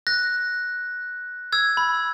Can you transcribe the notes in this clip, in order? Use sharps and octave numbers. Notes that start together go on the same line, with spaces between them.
F#6 A#6
E6 G#6
B5